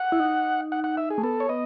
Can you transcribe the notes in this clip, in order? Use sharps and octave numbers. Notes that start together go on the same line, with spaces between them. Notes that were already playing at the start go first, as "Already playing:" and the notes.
Already playing: F#5
E4
D#4
F#5
F#5
E5
G#4
A3
B3 A4
C#5
B3 D#5